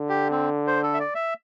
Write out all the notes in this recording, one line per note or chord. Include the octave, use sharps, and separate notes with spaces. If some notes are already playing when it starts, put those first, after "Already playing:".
Already playing: D3
G4
C4
C5
A4
E5
D5
E5